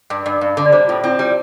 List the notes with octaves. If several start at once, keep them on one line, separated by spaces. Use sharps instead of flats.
G2
G2
G2
D3
D5
G3 C5
A2 F4
C4 E4
G3